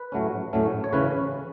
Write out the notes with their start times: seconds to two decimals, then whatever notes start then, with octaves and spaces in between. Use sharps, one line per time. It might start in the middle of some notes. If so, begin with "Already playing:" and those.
Already playing: B4
0.12 A2 F#3 A3 C#4
0.53 A2 F#3 A3 C#4
0.84 C#5
0.93 C#3 E3 C#4 B4